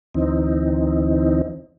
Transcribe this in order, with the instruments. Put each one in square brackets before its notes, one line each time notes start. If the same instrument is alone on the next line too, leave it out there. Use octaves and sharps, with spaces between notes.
[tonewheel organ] D2 E3 C4 D#4